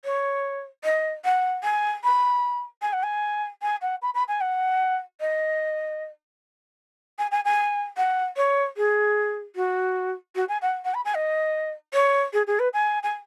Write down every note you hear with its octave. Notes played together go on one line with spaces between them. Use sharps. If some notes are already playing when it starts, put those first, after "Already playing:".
C#5
D#5
F#5
G#5
B5
G#5
F#5
G#5
G#5
F#5
B5
B5
G#5
F#5
D#5
G#5
G#5
G#5
F#5
C#5
G#4
F#4
F#4
G#5
F#5
F#5
B5
G#5
D#5
C#5
G#4
G#4
B4
G#5
G#5